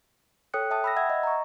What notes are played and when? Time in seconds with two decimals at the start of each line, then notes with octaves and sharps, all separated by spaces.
0.54 A4 C#5 G5 D#6 F#6 C#7
0.70 E5 G5 A5 D#6
0.84 B5 E6 A#6
0.96 E5 F#5 E6 G#6 A#6
1.10 D#5
1.23 A#5 C#6